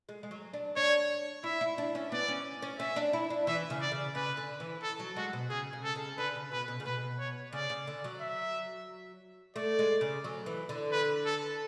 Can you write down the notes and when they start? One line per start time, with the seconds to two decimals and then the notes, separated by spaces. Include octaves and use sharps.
0.09 G#3
0.23 G#3
0.31 F#3
0.54 D4
0.76 D4 C#5
1.44 E4 E5
1.61 E4
1.78 D4
1.95 C#4
2.12 B3 D5
2.28 C#4
2.62 C#4
2.79 C#4 E5
2.96 D4
3.13 E4
3.30 D4
3.47 E3 E5
3.70 C#3
3.81 D5
3.92 C#3
4.15 C#3 B4
4.37 D3
4.60 E3
4.83 A4
5.00 F#3
5.16 G#3 F#4
5.33 B2
5.50 C#3 G#4
5.73 C#3
5.84 A4
5.96 C#3
6.18 D3 B4
6.35 C#3
6.51 B2 B4
6.68 B2
6.80 C#3
6.86 B2 B4
7.19 C#5
7.53 C#3 D5
7.70 C#3
7.87 D3
8.04 F#3
8.21 E5
9.56 A3 D5
9.79 G#3
10.01 C#3
10.24 F#3
10.46 E3
10.69 D3
10.92 B4
11.26 A4